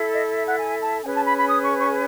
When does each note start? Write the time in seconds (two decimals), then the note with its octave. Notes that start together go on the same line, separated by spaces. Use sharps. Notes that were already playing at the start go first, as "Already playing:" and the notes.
Already playing: E4 A4
0.13 D#5
0.35 E5
0.47 F#5
0.58 G#5
0.81 A5
1.03 C#4 G#4 B4 G#5
1.14 A5
1.25 B5
1.37 B5
1.48 D#6
1.63 C#6
1.78 C#6